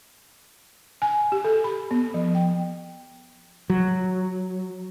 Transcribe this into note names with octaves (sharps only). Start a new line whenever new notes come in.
G#5
G4
A4
B5
B3
F3
G5
F#3